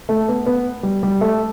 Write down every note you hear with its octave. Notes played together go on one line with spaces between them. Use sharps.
A3
B3
B3
G3
G3
A3